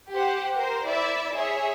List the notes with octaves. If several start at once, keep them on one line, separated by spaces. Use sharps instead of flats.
G4 C5 F#5
A#4 C5
E4 D5 E5
G#4 C#5 E5